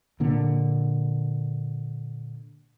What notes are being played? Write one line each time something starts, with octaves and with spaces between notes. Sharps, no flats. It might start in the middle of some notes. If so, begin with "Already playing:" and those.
A#2 D3 A#3